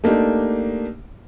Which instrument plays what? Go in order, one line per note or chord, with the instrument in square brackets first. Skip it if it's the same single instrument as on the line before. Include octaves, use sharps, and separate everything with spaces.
[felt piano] A3 A#3 D4 D#4 G4